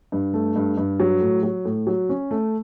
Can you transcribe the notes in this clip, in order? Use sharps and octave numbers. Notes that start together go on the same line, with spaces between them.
G2
A3
G2
G2
F#3
A2
F#3
A2
F#3
C#4
A3